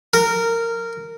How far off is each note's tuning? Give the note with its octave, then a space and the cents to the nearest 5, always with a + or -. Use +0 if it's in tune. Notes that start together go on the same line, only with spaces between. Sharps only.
A#4 -15